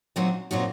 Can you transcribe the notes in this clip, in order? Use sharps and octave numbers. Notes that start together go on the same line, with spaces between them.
A#2 F#3 C4 D#4 F#4
A#2 F#3 C4 D#4 F#4